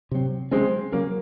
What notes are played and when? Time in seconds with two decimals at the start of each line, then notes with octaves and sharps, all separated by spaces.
0.11 C3 F#3 C4
0.51 C#3 F#3 G#3 C4 C#4
0.92 C#3 F#3 A#3 C#4